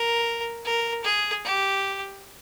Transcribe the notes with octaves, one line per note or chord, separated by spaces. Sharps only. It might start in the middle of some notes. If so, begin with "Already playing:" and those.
Already playing: A#4
A#4
G#4
G4